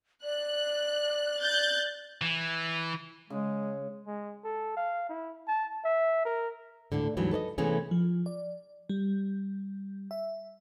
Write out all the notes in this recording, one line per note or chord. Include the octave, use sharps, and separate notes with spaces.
D5 F#6
F#6 G6 A6
E3
C#3 G#3
G#3
A4
F5
E4
A5
E5
A#4
D2 A2 D3
D2 G#2 E3 F#3 G3
A4 B4 D5 D#5
C3 E3 A3 B3 C#4 G#4
F3
D5
G3
E5